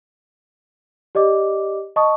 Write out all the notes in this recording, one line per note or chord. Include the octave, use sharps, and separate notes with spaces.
G4 D5 D#5 D6
D#5 A5 C#6 D#6